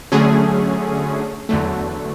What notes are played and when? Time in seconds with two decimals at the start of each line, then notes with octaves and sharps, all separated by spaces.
0.12 D3 F#3 A3 C#4 G#4
1.49 E2 D3 F#3 A3